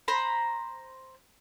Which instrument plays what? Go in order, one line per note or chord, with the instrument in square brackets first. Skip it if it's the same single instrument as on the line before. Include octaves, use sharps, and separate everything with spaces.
[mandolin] C5 A#5 B5